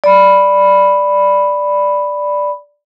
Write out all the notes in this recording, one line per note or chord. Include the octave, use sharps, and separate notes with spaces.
D5 B5